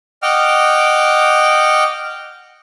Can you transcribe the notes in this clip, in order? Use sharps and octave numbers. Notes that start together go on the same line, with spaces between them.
D#5 F#5 G5 D6 F6